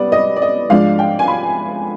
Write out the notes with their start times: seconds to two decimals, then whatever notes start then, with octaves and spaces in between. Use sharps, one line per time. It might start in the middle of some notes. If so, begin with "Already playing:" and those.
Already playing: G3 B3 D5
0.12 D#5
0.36 D5
0.42 D#5
0.70 G#2 F3 G#3 D4 F5
0.99 G5
1.19 G#5
1.28 B5